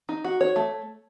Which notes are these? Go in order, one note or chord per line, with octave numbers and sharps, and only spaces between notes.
D#4
F#4
C#5
A3